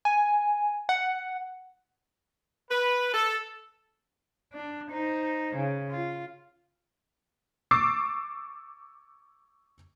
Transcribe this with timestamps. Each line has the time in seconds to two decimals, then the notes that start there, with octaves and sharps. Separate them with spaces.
0.05 G#5
0.89 F#5
2.70 B4
3.13 A4
4.53 D4
4.91 D#4 C5
5.56 C#3
5.89 F4
7.71 C#6 D6 E6 A6 C7